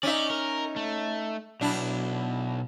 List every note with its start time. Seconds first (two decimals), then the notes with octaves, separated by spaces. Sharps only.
0.03 C#4 D#4 D5 E5
0.30 A#4
0.76 A3
1.61 B1 B2 D4 E4